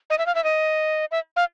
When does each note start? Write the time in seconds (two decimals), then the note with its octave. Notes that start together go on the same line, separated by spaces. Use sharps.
0.10 D#5
0.18 E5
0.26 F5
0.35 E5
0.44 D#5
1.11 E5
1.36 F5